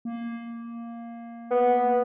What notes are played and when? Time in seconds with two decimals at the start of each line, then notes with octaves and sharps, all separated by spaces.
0.05 A#3
1.51 B3